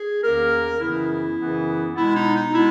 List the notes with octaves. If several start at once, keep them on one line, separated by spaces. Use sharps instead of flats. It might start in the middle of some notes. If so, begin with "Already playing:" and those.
Already playing: G#4
E2 D#3 A#3 C#4 A#4
F#2 C#3 E3 B3 E4
F#2 C#3 E3 B3
B2 G#3 B3 E4
D#4
D#4
B2 G#3 B3 E4